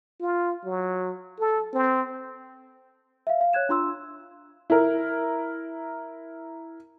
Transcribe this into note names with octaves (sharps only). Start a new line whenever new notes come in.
F4
F#3
A4
C4
E5 F5
F5
C#5 F#6 G#6 E7
D4 F4 C6 E6
E4 A#4